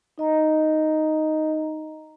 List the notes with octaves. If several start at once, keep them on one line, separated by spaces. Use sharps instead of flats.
D#4 D#5 A#5